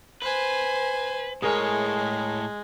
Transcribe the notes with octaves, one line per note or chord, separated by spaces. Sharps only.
B4 C5 G#5
A2 G#3 G#4 A#4 C#5